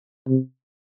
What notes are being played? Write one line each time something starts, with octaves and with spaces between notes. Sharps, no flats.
C3